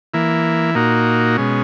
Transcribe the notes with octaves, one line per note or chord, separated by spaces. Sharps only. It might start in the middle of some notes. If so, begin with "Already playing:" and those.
E3 A#3 E4
A#2 A#3 D#4 F#4
B2 G#3 C#4